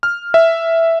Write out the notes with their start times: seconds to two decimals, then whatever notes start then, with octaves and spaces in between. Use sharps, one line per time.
0.03 F6
0.34 E5